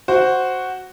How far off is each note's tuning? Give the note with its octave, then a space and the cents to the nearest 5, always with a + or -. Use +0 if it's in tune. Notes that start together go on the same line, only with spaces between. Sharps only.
F#4 +0 C5 +0